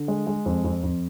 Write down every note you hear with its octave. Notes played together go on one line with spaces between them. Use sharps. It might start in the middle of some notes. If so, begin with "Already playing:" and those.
Already playing: D3
G#3
G#3
F2
F2
F2